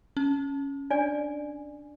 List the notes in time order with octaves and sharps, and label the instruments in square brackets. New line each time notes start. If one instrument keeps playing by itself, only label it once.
[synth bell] C#4
[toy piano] D4 D5 G#5